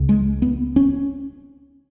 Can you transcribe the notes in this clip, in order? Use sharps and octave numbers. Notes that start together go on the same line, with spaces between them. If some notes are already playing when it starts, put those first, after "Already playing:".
Already playing: C#2 C#3
G#3
B3
C#4